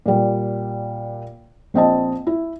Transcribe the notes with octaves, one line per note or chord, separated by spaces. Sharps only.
A#2 G3
A#1 C4 D#5 A5
E4